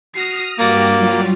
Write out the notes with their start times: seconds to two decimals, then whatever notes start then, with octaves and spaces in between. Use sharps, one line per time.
0.14 F#4 D#6 F6 A#6 C7
0.59 G2 A#3 F#4 G4 D5
0.96 F#3 G3 F4